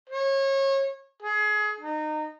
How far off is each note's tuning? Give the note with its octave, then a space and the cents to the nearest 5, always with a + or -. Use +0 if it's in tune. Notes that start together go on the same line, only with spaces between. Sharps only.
C#5 -30
G#4 +25
D#4 -25